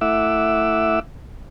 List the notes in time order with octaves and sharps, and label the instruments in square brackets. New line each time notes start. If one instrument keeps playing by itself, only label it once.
[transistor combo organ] A3 E4 E5 F#5 D6 E6